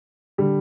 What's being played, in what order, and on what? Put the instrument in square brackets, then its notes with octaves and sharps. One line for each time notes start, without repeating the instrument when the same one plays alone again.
[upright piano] D3 G3